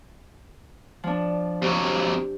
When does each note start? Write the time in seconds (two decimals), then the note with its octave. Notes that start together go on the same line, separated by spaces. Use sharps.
1.04 F3 D4
1.62 F2 F#3 G4